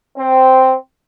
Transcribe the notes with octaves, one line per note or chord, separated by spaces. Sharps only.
C4